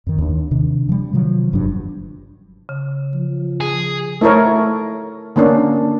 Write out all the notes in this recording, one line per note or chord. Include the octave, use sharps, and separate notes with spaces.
F2 D#3
D#2 D4
C3 D#3 D4
F3 G3
C3 D#3 F3 F#3
F#1 G2 F#3 D4
C#3
F3
G#4
A3 E4 A4 A#4 C#5
D3 A#3 C#4 D4